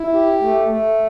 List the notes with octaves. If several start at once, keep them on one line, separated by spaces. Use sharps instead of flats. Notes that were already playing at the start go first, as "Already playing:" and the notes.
Already playing: E4
G4
A3
A3